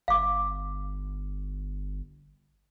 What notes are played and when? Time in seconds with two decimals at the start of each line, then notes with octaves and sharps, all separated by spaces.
0.08 G1 F5 D6